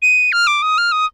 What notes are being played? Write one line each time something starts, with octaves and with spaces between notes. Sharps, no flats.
D#7
F6
D6
D#6
F6
D#6